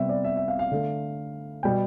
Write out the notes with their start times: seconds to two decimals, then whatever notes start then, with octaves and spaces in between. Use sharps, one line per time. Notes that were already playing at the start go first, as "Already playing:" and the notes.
Already playing: C3 G3 B3 E5
0.09 D5
0.24 E5
0.37 E5
0.48 F5
0.59 F5
0.71 D3 A3
1.63 B2 G3 B3 G5